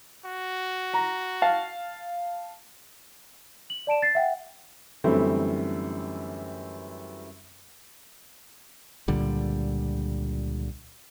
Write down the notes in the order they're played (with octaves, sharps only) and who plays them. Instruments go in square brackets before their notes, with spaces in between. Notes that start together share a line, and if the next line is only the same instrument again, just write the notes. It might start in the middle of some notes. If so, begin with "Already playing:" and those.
[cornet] F#4
[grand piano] A#5
F5 A5
[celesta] F#7
D5 A5 D7 E7
A6 C7
E5 F#5 G5
[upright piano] F#2 D3 E3 G3 A3 C4
[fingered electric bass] C#2 A#2 D3 G3